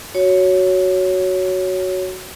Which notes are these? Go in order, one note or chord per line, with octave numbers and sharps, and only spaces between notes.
F#4 C#5